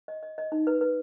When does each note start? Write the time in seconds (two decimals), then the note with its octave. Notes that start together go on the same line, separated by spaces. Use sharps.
0.08 D#5
0.23 D#5
0.38 D#5
0.52 D#4
0.67 B4
0.81 B4